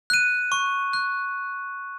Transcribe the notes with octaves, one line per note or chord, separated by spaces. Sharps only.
F#6 D#7
C#6
F#6